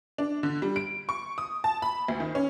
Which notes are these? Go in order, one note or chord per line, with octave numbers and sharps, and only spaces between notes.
D4
D3
G3
D7
C#6
D#6
A5
B5
D2
D#3
C#4